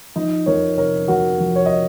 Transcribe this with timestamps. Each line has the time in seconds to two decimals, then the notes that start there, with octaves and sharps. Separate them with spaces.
0.16 F3 D#4
0.46 F2 A#4 C#5
0.77 C3 A#4 C#5
1.08 F2 F#4 A#4
1.40 F3
1.56 C#5
1.66 D#5